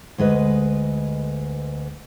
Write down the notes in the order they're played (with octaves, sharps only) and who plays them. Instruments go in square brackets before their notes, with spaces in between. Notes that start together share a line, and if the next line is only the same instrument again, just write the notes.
[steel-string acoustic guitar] D2 G#3 B4 D#5